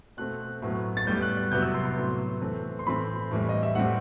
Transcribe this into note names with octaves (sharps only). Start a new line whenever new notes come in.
B2 A3 C4 F#6
A2 F#3 B3
A6
A2 G3 B3 G6
F#6
F#6
C3 F#3 B3 G6
E6
C6
C6
A2 F#3 B3
E3 A3 C4
C6
A2 E3 A3 C4 B5
A2 E3 G3
D#5
E5
A2 G3 C4 F#5